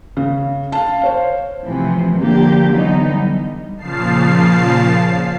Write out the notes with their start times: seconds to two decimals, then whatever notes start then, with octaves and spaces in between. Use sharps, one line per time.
0.17 C#3
0.72 F5 A5
1.01 C5 C#5 F5
1.64 A2 C3 E3 F3
2.18 D3 F3 A#3 D4 G4
2.71 D3 E3 F#3 B3 D#4
3.11 G3
3.77 A#2 C#3 F3 F5 A5 C7